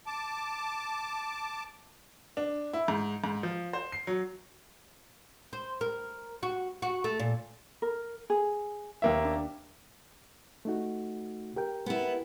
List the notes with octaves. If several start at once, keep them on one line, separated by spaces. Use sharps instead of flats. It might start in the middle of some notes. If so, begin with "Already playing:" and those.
A5 D6
D4
E4
G#2
G#2
F3
C5
C7
F#3
C5
A#4
F#4
F#4
A3
A#2
A#4
G#4
D#2 A#3 E5
D4
A3 D#4 F#4
G4 A#4 G5
B3 E4